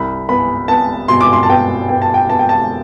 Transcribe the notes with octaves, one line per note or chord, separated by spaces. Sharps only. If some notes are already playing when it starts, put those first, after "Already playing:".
Already playing: C2 B5
B3 B5
B3 A5
B2 C6
D6
C6
A5
B3 G5
B3 G5
A5
G5
B3 A5
G5
A5